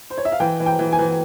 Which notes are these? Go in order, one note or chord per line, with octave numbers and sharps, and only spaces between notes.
C5
C#5
E5
F5
E3 G5
E3
G5
E3
G#5
E3